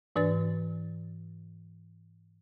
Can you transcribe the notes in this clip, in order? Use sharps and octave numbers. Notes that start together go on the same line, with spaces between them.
G#2 E3 D4 B4 D5 A6